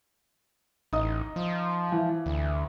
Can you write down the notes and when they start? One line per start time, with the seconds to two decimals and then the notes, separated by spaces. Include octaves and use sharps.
0.93 A1 D#4 D#5 D#6
1.36 F3
1.92 E3
2.26 D2